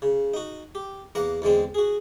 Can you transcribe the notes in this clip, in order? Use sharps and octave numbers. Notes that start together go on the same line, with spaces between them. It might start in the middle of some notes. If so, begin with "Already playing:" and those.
C#3
D#4 F#4
G4
E2 A#3 F#5 A#5
E2 D3 G#3 C4
F#4 G#4